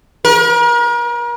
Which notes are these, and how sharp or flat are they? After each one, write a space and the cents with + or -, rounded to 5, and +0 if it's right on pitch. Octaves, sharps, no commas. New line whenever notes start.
A#4 +40